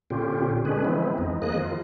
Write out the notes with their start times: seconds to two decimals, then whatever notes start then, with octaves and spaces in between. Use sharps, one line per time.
0.10 A#2 D3 C4 C#4 F4 G4
0.65 D3 G#3 C#4 D4 G#4 B4
0.85 E3 F3 G#3 B3 C4 E4
1.18 F2 G#3 D#4
1.42 D#3 F3 A#3 G#4 D#5 F#6
1.60 F4